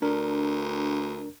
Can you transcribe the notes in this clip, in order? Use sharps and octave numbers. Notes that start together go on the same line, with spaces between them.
D2 D4 A#4